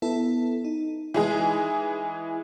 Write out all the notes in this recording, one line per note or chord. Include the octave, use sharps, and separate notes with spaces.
B3 E4 A4
D#4
E3 G#3 G#4